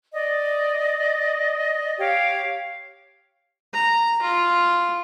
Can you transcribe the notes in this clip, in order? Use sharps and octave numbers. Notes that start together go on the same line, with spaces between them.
D5 D#5
G4 C#5 F5 G5
A#5
F4